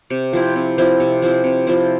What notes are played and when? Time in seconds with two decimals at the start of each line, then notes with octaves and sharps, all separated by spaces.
0.10 C3
0.33 F3 C4 E4
0.56 C3
0.78 F3 C4 E4
1.00 C3
1.22 F3 C4 E4
1.44 C3
1.67 F3 C4 E4